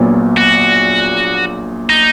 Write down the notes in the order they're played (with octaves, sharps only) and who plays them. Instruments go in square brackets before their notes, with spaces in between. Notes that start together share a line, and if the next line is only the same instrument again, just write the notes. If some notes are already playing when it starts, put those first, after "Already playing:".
Already playing: [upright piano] A#1 A#2 F#3 B3
[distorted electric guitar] F#4
D#4